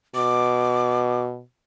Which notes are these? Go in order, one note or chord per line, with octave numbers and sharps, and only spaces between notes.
B2 D6